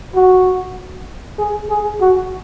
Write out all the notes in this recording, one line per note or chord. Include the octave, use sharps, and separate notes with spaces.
F#4
G#4
G#4
F#4